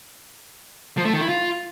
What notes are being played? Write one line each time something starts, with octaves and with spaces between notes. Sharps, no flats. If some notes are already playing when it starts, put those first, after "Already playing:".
F3
A3
D#3
E4
F4